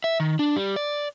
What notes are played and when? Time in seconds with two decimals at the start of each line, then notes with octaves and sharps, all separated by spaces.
0.04 E5
0.20 D#3
0.39 D4
0.56 G3
0.76 D5